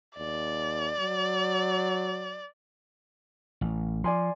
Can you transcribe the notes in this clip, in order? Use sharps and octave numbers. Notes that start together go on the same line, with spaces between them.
D#2 D5
F#3
A1
F3 D5 G#5 C6